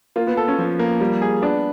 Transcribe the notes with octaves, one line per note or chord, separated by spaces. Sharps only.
A#3 F4
B3
A4
C#4
F3
A#3
G3
G#4
B3 D4